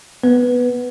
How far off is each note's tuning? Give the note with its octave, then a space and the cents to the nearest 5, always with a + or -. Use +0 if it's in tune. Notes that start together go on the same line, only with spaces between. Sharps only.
B3 +0 B4 +0